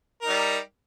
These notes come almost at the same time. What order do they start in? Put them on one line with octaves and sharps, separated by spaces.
A#4 D#4 G3